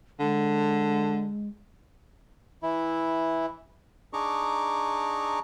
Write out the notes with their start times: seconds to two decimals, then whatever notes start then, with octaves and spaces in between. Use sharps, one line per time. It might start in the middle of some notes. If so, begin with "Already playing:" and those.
0.20 D3 G#3
2.63 E3 E4
4.13 D4 D#4 G#4 A#5 C#6 D6